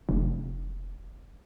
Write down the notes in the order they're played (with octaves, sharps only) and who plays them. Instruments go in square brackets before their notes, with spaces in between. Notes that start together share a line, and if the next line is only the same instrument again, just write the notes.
[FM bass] F1